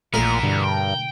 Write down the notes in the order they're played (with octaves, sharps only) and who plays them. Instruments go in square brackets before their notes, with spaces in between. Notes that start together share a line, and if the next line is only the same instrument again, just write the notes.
[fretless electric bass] A#1 A3 [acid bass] A#2 [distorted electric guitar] E3 B3 [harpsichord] A#4
[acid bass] G2 [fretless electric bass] B2 D3
[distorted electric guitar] G5